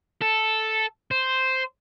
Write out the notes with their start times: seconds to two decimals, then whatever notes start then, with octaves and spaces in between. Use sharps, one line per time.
0.21 A4
1.11 C5